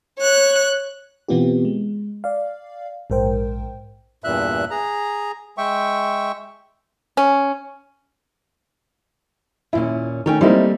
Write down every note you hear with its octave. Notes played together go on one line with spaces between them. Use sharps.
C#5 F#6
B2 E3 B3 C4 F4 G4
G#3
D5 F5
A#1 G#2 A#4 C5 G5
E2 G2 A#2 E5 F#6
G#4 A#5
G#3 E5 G5 C#6
C#4
D#2 A#2 C#4 E4
D#3 A3 C#4 G5
G3 A3 A#3 C4 D#4 E4